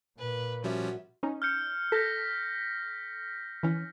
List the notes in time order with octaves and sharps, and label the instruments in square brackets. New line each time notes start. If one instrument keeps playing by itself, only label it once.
[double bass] A#2 [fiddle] B4
[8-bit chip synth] F3 G3 C#4 [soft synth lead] F#4 [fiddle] E5
[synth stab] C#4 D#4
[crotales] F6 G6 C#7
[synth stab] A4 [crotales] G6 A#6 B6
[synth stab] E3 C#4